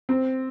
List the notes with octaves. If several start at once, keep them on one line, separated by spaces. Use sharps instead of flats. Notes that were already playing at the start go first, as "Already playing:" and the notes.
C4